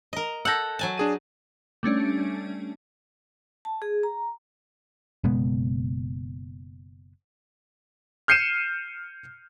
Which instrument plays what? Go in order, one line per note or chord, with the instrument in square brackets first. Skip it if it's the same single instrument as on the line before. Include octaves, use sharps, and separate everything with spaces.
[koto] A#4 D#5
[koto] A4 F#5 [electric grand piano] E6 G6 A#6
[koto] F#3 G#5 A5
[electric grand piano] D4 G#4 D#7
[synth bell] G3 A3 C#4 D4
[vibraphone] A5
G#4
A#5
[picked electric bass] F#1 B2 G#3 B3
[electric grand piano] F6 G6 C7 C#7 D#7 E7